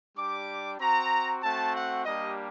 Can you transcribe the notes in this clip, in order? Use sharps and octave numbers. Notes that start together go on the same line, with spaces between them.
G3 D4 G4 D6
C4 F#4 A#5
A3 C4 F#4 A5
F#5
G3 A#3 D4 G4 D#5